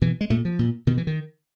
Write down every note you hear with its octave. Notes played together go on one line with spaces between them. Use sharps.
B2 E3
G#3
A#2 A3
F3
A#2
B2 D#3
E3
D#3